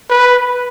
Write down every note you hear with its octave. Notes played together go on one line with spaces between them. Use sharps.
B4